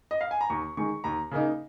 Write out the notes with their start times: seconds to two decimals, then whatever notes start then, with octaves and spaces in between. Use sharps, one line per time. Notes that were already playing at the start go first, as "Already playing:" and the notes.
0.11 D#5
0.21 F5
0.31 G#5
0.41 A#5
0.50 D#2 C#6
0.77 D#3 G#3 C#6
1.04 D#2 A#5
1.31 C#3 A#3 D#4